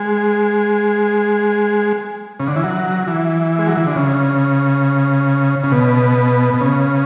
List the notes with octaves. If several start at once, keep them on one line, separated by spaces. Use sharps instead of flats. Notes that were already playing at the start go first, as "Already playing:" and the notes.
Already playing: G#3
C#3
D3
E3
F#3
E3
G#3
F#3
E3
D3
C#3
C#3
B2
B2
C#3